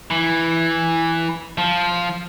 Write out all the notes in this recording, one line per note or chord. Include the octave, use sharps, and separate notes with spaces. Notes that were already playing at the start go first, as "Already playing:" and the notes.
E3
F3